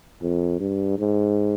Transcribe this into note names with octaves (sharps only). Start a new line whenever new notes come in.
F2
G2
G#2